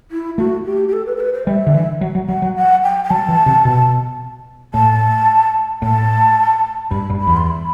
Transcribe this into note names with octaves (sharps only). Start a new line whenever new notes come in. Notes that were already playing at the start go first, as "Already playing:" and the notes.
E4
A3 F#4
G4
G4
A4
B4
A4
B4
C5
G3 E5
D3
E3
F#3
F#3
F#3 F#5
F#3
F#5
G5
G5
F#3 A5
E3
C3
B2
A2 A5
A2 A5
G2 B5
G2
B5
E2
C6
B5